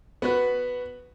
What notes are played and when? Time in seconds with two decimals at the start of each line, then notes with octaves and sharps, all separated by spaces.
0.22 B3 F#4 B4